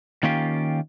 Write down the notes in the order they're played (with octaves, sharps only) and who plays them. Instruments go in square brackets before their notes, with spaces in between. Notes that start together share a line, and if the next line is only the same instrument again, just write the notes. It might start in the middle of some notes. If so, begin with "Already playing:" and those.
[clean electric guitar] D#3 A#3 C#4 F4 G4